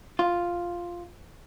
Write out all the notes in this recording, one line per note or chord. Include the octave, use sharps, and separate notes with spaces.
F4